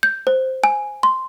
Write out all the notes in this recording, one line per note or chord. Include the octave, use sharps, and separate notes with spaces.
G6
C5
G#5
C6